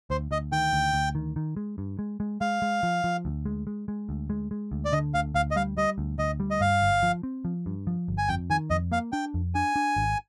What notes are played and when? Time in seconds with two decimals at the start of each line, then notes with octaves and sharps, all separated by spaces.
0.10 D2 C5
0.31 D2 D#5
0.52 D#3 G5
0.73 D2
0.94 D2
1.15 D#3
1.36 D#3
1.57 G#3
1.78 G2
1.99 G#3
2.20 G#3
2.41 G#3 F5
2.62 G#3
2.83 F3
3.04 F3
3.25 D2
3.46 G#3
3.67 G#3
3.88 G#3
4.09 D2
4.30 G#3
4.51 G#3
4.72 D2
4.85 D5
4.92 D3 D#5
5.14 D2 F5
5.34 D2 F5
5.51 D#5
5.56 G3 F5
5.77 G3 D#5
5.98 D2
6.18 D2 D#5
6.40 G3
6.50 D#5
6.61 G2 F5
6.82 G1
7.03 F3
7.23 C4
7.45 F3
7.66 G2
7.87 F3
8.08 G1
8.18 G#5
8.29 F2 G5
8.50 D#3 G#5
8.70 F2 D#5
8.92 A#3 F5
9.12 D4 G5
9.34 F2
9.55 D4 G#5
9.76 D4
9.96 G#1